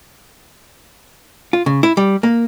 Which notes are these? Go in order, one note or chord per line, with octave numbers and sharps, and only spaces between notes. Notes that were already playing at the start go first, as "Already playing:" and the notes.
F4
C#3
E4
G3
A#3